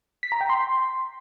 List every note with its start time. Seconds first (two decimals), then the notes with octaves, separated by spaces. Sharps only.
0.23 B6
0.32 A#5
0.41 G5
0.49 C6